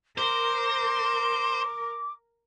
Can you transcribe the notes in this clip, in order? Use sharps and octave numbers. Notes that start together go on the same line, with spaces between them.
A#4 C5 D6